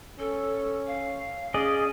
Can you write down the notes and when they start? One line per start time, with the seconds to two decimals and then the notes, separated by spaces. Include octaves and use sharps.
0.19 C#4 A4
0.87 F5
1.54 C#4 G#4 D5 D#5